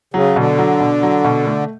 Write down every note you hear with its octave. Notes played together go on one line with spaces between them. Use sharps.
C#3 F#3
B2 D3
F#3
B2
F#3
B2
A3